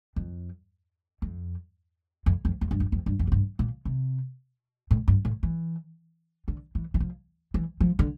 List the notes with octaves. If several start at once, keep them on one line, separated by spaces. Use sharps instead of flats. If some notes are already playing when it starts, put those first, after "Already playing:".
F2
F2
F2
F2
E2
G2
F2
F2
G2
F2
A2
G2
A#2
C3
A2
G2
A2
E3
D3
E3
E3
F3
E3
F3
D3